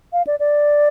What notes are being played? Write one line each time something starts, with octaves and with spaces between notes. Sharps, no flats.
F5
D5
D5